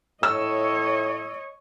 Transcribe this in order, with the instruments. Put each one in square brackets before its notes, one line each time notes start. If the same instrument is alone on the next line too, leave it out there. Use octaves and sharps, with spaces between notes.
[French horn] A2 [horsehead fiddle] C#5 D#5 [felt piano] E6